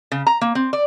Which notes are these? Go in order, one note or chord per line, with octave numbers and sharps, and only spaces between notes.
C#3
A#5
A#3
C4
D5